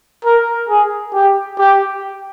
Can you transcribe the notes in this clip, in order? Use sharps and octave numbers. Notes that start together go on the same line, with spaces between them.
A#4
G#4
G4
G4